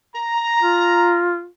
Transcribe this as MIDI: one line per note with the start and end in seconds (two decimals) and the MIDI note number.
0.15 1.29 82
0.61 1.46 65